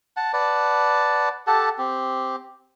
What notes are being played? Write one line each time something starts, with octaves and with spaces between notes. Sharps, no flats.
F#5 A5
B4 D5 F#5 A5
G4 A4 F#5 A5
C4 G4